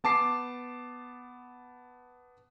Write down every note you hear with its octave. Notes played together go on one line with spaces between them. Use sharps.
B3 A5 D6 C7